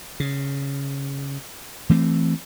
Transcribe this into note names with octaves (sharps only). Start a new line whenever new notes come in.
C#3
E3 A3 C4